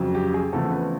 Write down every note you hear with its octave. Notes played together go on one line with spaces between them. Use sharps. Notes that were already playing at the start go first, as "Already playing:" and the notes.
Already playing: F2 C#3 F#3
G4
G#4
E2 C#3 F3 A3 C4 A4
B4